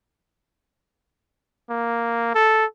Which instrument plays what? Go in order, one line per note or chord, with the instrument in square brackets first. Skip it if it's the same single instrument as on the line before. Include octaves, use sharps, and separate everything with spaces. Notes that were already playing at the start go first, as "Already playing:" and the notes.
[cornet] A#3
A4